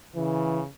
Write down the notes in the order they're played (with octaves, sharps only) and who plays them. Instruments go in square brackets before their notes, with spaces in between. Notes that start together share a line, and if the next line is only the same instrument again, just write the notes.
[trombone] C#3 [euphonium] E3